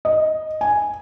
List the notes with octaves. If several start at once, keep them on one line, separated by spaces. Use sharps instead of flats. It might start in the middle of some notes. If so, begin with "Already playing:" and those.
D#5
G#5